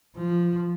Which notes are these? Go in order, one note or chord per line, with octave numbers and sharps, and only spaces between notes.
F3